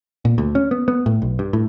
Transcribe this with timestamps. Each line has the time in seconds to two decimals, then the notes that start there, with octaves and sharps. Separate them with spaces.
0.25 A#2
0.38 D2
0.55 C#4
0.71 B3
0.88 B3
1.06 A2
1.22 B1
1.39 G2
1.53 A2